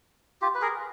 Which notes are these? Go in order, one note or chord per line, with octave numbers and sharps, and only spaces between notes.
F4 G4
B4
G#4 A#4